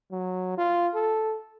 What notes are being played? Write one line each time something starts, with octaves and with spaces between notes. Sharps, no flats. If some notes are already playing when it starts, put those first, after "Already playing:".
F#3
F4
A4